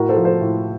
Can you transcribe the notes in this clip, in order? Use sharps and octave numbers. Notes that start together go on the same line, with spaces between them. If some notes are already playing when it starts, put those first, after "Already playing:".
Already playing: A2 F#4 A#4
A4 C5
F3
A4 C5
A2